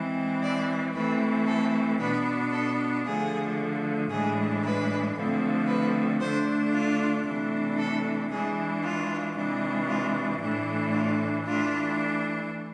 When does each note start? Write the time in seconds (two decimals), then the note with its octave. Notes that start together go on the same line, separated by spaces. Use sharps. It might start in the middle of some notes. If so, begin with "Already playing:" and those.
Already playing: E3 G#3 C4
0.43 D5
0.95 E3 A3 C4 B4
1.47 A4
2.00 B2 B3 D4 B4
2.53 A4
3.05 D3 F3 A3 G#4
4.10 A2 E3 G#3 D4 G#4
4.63 B4
5.15 D3 F3 A3 C4
5.67 B4
6.20 D3 A3 D4 C5
6.73 F4
7.26 C3 E3 A3 D4
7.79 A4
8.31 E3 G#3 D4 G#4
8.83 F4
9.36 C3 E3 G#3 D4
9.88 F4
10.40 A2 E3 A3 D4
10.93 F4
11.46 E3 A3 D4 F4